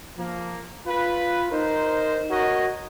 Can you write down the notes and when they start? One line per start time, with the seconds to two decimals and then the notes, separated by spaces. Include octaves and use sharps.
0.17 F3 A#3
0.86 F4 B4
1.51 D#4 A#4 C5
2.30 F#4 A#4 C#5 D#5